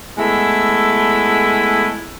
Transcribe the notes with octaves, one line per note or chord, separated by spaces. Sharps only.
G#3 A3 B3 E4